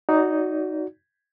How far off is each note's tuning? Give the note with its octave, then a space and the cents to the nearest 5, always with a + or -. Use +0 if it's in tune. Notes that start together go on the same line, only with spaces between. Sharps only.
D#4 +0 F#4 +0 D5 -30